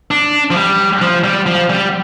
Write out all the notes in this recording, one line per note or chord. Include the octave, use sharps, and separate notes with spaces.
D4
F3
G3
F3
G3
F3
G3